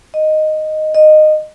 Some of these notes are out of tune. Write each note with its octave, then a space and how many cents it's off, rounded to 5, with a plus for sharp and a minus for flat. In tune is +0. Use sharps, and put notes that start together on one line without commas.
D#5 -5
D#5 -15